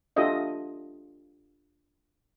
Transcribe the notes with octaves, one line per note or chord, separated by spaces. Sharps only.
D4 F4 G4 A4 D#5 E5